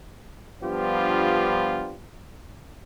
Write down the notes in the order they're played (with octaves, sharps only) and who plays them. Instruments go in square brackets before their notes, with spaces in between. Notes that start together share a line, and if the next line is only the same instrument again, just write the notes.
[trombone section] G2 F3 B3 D4 F4 G4